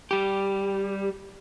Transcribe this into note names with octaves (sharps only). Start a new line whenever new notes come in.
G3 G4